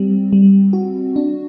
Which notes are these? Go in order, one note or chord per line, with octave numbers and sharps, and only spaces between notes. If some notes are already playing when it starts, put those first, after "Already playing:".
Already playing: G3 C4
G3
F#4
D4